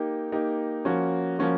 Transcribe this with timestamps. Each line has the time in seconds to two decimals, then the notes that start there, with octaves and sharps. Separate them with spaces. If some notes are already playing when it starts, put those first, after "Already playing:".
Already playing: A#3 D#4 G4
0.32 A#3 D#4 G4
0.85 F3 A#3 C#4 F#4
1.39 F3 A#3 C#4 F#4